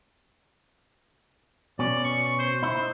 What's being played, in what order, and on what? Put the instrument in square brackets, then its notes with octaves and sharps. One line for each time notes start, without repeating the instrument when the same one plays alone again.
[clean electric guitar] B2 C#4 [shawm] D5
[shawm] C#6
C5
[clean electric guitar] D#4 E4 [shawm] C5